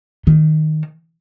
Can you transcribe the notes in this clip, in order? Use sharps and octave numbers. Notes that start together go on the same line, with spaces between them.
D#3